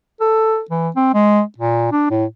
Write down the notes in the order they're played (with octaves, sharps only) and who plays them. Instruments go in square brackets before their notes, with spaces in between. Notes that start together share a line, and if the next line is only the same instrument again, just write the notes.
[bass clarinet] A4
E3
C4
G#3
A#2
D4
A2